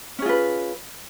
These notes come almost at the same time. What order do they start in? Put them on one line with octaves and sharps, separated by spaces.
C#4 G#4 F4 B4